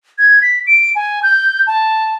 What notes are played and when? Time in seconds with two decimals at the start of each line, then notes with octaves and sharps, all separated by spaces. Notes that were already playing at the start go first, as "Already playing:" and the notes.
0.19 G#6
0.42 B6
0.67 D7
0.96 G#5
1.23 G6
1.67 A5